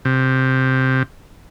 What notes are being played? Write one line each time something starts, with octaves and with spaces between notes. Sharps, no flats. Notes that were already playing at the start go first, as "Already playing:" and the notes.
C3